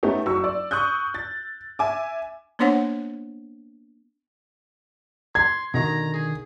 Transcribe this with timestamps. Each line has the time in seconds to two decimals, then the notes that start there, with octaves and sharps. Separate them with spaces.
0.03 A3 B3 C#4 D#4 G4
0.26 F#1 F#3 C#6 E6
0.44 D5
0.71 C#6 D#6 F#6 G6
1.14 A6
1.79 E5 G#5 D6
2.59 A#3 B3 D4 C5 C#5 F#5
5.35 C6 G#6
5.74 B2 D3 D#3 A#5
6.13 G#4